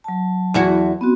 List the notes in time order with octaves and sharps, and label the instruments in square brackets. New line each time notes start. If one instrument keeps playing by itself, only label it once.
[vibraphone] F#3 A5
[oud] E2 E4 F#4
[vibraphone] B3 C4 F#4